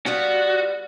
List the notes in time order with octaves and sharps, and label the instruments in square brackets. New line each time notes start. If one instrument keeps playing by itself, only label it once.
[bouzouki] G3 B3 F4 [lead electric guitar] F#4